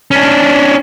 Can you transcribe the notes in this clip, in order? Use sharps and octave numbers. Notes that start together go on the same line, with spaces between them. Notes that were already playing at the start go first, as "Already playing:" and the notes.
C#4 D4